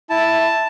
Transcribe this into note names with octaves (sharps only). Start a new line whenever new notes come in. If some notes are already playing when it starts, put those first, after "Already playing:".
E4 A5